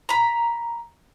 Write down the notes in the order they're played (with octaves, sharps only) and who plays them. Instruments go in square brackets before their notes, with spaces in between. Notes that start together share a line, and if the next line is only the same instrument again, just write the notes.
[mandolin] A#5 B5